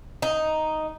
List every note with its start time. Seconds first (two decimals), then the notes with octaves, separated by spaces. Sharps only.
0.22 D#4